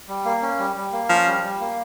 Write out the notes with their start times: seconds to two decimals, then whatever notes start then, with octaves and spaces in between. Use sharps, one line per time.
0.08 G3
0.25 A#3
0.42 C#4
0.59 G3
0.76 G3
0.92 A#3
1.09 F3 C#4
1.27 G3
1.44 G3
1.60 A#3